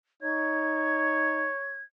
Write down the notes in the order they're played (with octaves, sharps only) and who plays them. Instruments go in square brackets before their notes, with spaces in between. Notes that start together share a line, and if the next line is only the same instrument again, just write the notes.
[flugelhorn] D#4 [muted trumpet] C#5 [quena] G#6